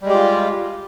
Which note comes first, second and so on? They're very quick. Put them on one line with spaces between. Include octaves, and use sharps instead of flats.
G3 G#3 G4 F4